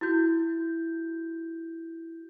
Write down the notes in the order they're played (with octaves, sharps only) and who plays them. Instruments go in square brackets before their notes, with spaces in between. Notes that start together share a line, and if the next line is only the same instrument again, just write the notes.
[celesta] E4 F#4 G6